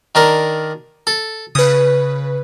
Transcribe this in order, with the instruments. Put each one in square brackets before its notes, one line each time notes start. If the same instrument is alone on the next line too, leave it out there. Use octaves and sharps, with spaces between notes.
[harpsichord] D#3 D4 A#4
A4
[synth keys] C#3 B4 [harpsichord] D#6